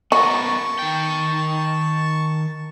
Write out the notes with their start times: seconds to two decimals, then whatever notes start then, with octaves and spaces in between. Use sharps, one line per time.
0.12 B3 F#4 A#4 A5 C#6
0.79 D#3 G5